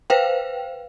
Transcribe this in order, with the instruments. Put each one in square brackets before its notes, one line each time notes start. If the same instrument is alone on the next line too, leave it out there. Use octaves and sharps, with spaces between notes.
[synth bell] B4 C5 F5 G5